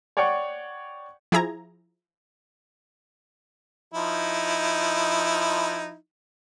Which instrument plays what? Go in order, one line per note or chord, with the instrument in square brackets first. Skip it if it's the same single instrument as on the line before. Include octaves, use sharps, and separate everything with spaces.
[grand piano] C#5 D5 F#5 G5 C#7
[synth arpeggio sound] F3 E4 G#4 A#5 G#6
[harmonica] F3 D#4 E4